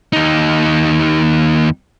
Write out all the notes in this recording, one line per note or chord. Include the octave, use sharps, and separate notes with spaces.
D#2 D#4